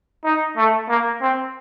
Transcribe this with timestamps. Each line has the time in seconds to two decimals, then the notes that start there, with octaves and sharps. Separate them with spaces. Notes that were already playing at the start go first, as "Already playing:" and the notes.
0.25 D#4
0.57 A3
0.89 A#3
1.22 C4